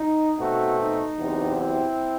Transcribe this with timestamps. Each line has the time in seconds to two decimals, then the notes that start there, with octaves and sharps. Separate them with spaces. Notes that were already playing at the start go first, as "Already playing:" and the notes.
Already playing: D#4
0.38 B2 A3 C4 D#4 F#4
0.79 D#4
1.19 E2 C3 F#3 C4
1.59 C4 E4